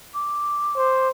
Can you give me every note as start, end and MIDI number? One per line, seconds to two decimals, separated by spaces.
0.14 1.07 86
0.76 1.09 72